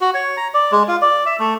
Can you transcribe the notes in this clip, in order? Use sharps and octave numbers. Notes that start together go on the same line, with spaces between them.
F#4
C#5
A#5
D5
G#3
F4
D5
E5
A3